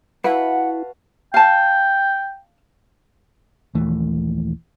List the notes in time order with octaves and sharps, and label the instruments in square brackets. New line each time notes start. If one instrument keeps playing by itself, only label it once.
[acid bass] E4 [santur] F#4 F5 A5 [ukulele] B4 [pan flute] F#5
[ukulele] F5 A5 [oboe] G5
[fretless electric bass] A#1 D#2 E3 A3